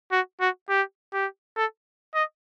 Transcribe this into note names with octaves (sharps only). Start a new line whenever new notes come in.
F#4
F#4
G4
G4
A4
D#5